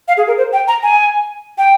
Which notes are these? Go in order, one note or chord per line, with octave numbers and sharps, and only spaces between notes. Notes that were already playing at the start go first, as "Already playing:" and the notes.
F5
G#4
A#4
C5
G5
A#5
G#5
G5